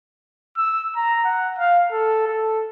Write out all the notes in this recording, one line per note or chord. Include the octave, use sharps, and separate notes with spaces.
E6
A#5
F#5
F5
A4
A4